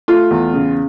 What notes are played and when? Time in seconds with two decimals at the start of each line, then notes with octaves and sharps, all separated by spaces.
0.08 A3 F4
0.31 E2
0.53 C#3